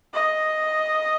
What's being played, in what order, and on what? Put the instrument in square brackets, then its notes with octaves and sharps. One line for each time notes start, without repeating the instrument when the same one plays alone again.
[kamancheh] D#5